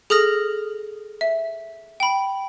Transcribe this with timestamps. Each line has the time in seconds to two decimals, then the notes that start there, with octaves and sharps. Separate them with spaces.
0.10 G#4 A4 D#6 F6 A#6 F7
1.21 E5
2.00 G5 B5